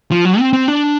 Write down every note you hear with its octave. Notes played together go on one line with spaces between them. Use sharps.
F3
F#3
C4
C4
D4